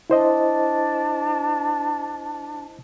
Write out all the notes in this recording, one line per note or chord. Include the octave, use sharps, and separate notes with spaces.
D4 E4 C5 D#5